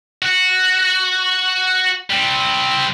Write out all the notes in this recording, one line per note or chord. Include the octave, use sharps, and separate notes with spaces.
F#4
G3 C4